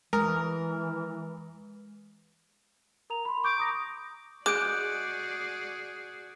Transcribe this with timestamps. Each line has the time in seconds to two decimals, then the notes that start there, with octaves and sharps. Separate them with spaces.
0.13 E3 G#3 A#4
3.10 A#4 A#5 F7
3.25 B5 C6
3.44 C#6 D6 G6
3.58 A#5 D#6 A#6
4.46 G#3 F#4 G#4 D5 D6 F#6 G6 D7